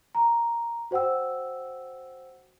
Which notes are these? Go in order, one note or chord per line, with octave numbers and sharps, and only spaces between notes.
A#5
F#4 C5 F#5 G5 E6